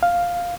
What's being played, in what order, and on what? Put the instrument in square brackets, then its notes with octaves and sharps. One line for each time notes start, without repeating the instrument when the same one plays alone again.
[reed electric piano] F5